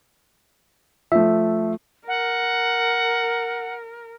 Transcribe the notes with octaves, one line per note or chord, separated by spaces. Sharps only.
F3 A3 E5
A#4 F#5